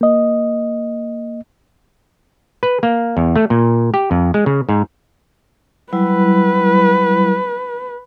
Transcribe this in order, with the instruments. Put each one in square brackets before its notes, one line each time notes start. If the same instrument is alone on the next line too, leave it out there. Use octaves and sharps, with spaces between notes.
[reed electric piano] A#3 D#5
[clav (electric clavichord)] B4
A#3
E2
A3
A#2
G4
F2
G#3
C#3
G#2
[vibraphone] F#3 G3 E4 [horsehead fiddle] B4